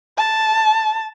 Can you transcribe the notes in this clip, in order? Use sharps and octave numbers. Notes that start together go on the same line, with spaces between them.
A5